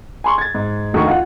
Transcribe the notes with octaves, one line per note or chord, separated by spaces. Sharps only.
G#5 C6 C#6
G#6 A6
G#2
F1 D2 D#3 C#6
F4 F#5